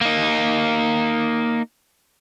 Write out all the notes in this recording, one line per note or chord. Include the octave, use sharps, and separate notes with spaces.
A#3 D#4